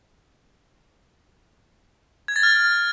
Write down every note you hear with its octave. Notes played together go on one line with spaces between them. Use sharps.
G#6
A6
F6